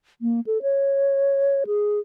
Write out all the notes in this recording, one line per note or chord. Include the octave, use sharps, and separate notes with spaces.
A#3
A4
C#5
G#4